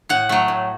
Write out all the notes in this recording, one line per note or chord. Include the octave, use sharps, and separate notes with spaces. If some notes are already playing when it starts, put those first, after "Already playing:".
A2 F#5
F#3 A3
A2